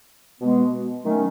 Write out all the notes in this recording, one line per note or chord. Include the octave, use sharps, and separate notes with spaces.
B2 G#3 B3
D#3 F#3 A3 C#4